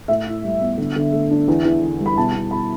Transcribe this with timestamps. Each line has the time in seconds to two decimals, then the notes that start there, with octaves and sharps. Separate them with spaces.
0.08 A2 E5
0.27 E4
0.44 G3
0.61 B3
0.78 D3
0.96 D3
1.12 A3
1.31 D4
1.48 E2
1.65 E2
1.82 D3
2.00 G3
2.06 B5
2.17 B2 A5
2.35 B2
2.51 B3 B5